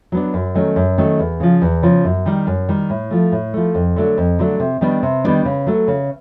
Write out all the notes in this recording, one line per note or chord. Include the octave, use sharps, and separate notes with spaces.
F#3 B3 D4
F#2
D#3 F#3 A3 C#4
F#2
D#3 F#3 A3 C#4
E2
C#3 F3
E2
C#3 F3
F#2
D#3 G3
F#2
D#3 G3
A2
F3 A3
A2
F3 A3
F2
D3 F#3 A3 D4
F2
D3 F#3 A3 D4
C3
D#3 G3 B3 D4
C3
D#3 G3 B3 D4
C#3
F#3 A3
C#3